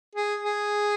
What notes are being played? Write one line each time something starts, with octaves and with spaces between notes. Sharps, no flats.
G#4
G#4